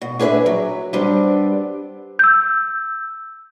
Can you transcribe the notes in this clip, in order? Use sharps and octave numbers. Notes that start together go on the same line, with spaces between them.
B2
D4 G#4 B4 C5 E5
F#3
G3 B3 C4 D4
E6 G6